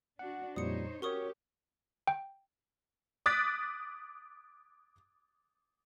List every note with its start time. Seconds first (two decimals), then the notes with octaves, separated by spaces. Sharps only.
0.19 D4 F#4 F#5
0.56 F2 A#2 G3 D#4 C5 C#5 D#6 C#7
1.02 C#4 F#4 G4 A#4 C#5 C#6 D#6
2.07 G5
3.26 D6 D#6 F#6 A6 B6 D7